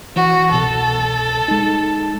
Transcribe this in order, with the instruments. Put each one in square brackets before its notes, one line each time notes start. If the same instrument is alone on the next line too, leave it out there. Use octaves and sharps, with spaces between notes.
[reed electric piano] E3 [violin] F#4
[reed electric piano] C2 B2 [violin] A4
[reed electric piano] G#3 D#4